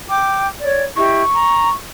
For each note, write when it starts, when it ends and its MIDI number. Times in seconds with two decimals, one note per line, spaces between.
0.09 0.48 79
0.09 0.48 86
0.61 0.82 73
0.61 0.82 74
0.96 1.22 64
0.96 1.22 67
0.96 1.22 75
0.96 1.73 85
1.35 1.69 82